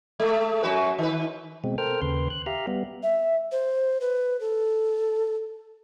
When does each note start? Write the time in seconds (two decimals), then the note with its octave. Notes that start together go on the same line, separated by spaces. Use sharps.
0.20 G#3 A3
0.63 F#2 F#4 B4
0.98 D#3 B4
1.64 B2 G#3 C4
1.78 A4 A#4 C5 G5 F6
2.02 D#2 C#3 B4 C6
2.30 F#6
2.46 G4 E5 F5 A#5
2.67 G3 B3
3.03 E5
3.52 C5
4.01 B4
4.41 A4